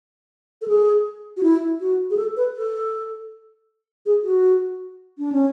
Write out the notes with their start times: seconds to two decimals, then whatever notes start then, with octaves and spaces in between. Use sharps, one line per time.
0.62 A4
0.68 G#4
1.37 F#4
1.43 E4
1.80 F#4
2.10 G#4
2.17 A4
2.37 B4
2.55 A4
4.06 G#4
4.24 F#4
5.18 D4
5.32 C#4